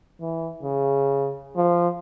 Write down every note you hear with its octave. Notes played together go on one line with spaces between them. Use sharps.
E3
C#3
F3